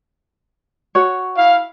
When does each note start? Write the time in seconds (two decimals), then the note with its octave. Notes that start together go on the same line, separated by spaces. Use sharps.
0.95 F#4 C#5
1.37 E4 F5